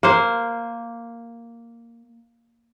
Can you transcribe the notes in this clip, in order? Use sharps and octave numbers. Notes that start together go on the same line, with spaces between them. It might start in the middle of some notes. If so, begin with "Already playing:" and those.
A#3 C5